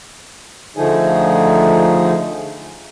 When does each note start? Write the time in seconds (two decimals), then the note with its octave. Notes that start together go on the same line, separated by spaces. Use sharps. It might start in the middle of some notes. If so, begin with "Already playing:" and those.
0.77 D3 F3 A3 D#4 G#4